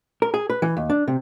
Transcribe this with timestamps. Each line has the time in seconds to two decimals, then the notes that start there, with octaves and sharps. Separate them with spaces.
0.22 A#4
0.34 G#4
0.50 B4
0.62 E3
0.77 D#2
0.90 D4
1.08 C3